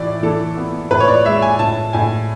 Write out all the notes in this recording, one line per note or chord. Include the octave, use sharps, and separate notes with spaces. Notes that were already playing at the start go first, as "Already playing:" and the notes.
Already playing: A2 E3 D5
E3 A4
B3
A2 B4
C#5
D5
G#3 E5
G#5
A2 A5
A2 G#5